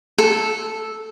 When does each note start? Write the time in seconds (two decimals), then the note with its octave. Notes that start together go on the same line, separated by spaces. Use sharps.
0.18 A4